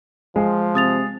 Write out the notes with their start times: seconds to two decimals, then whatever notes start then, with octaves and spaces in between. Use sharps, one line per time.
0.36 F3 G#3
0.75 C3 D#6 A6 F7